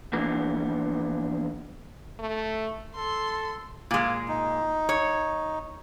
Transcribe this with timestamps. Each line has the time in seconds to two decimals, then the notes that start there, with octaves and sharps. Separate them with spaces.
0.13 E3 F3 A#3 B3 D4
2.19 A3
2.95 A4 C6
3.91 A#2 G#3
4.28 D#4
4.89 C#5